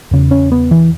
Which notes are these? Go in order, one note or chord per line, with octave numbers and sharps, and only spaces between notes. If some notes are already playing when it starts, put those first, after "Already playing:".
E2 C#3
C#4
B3
E3